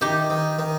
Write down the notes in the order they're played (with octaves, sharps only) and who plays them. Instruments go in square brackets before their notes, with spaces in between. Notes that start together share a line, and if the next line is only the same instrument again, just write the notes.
[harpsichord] D#3 [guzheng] D#4 G4
[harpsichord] D#3
D#3